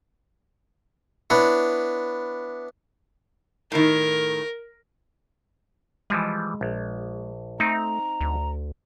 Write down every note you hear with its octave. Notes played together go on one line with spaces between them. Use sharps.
B3 D4 E4 C#5
A2 D#3 A#4
E3 F3 G3 G#3
A#1
A3 C4 D#4 A#5
D2